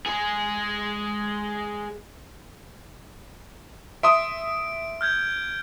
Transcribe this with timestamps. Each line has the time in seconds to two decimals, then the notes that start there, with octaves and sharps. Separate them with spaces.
0.06 G#3 G#4
4.03 E5 C6 D#6 D7
5.01 F6 G6 G#6